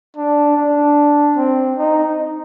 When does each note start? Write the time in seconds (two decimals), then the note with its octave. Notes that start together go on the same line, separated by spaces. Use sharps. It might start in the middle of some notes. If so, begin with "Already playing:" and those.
0.17 D4
0.57 D4
1.36 C4
1.78 D#4